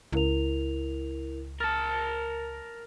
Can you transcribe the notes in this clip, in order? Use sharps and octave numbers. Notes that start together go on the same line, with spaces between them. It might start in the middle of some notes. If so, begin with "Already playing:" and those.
C#2 E4 A#4 F7
A#4 A5 F6 A6